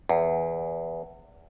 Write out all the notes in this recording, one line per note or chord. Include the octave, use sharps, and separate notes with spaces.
E2